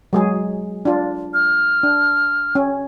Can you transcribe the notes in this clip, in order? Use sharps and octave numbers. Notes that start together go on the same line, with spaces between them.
F#3 G#3 G#4
D4 F4
F6
D4
C#4